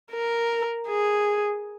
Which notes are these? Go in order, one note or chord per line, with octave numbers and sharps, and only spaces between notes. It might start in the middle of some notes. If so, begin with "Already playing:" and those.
A#4
G#4